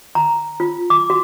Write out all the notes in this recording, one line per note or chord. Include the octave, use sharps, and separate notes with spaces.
A#5
F4
D6
F#4